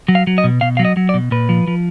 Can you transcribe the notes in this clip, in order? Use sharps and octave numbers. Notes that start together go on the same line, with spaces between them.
F#3
F5
F#3
D#5
B2
B2 F5
F#3 F5
D#5
F#3
D5
B2
A#2 B4
F3
F3